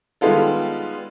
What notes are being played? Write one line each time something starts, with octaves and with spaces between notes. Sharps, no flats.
D#3 G3 G#3 B3 F4 A4